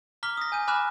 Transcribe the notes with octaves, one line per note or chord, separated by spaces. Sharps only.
A#5 D6 F6 B6 G7
D#6 A#6
G#5 G6 D#7
G#5 B5 D6 F6 F#6 E7